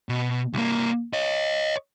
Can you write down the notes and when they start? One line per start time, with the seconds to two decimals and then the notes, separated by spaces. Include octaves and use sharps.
0.09 B2
0.54 C2 A#3
1.13 C#5 D#5